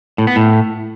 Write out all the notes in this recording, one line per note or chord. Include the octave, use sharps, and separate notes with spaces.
A2
B3
A2